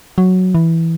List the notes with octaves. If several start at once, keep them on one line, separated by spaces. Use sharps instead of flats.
F#3
E3